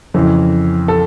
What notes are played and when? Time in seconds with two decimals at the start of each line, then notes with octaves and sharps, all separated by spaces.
0.14 F2 C#3 E3
0.88 A4